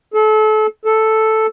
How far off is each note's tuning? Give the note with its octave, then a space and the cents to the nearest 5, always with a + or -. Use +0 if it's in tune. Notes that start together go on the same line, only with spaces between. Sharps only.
A4 -30
A4 +0